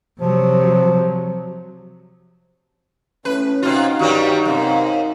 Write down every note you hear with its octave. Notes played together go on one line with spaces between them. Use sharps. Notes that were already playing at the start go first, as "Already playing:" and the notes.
C3 F3 F#3
A2 C#4 B4
C3 D#4 F4 F#4
G2 D#3 F#3 G3 G4
F#2 C3 A#4 F5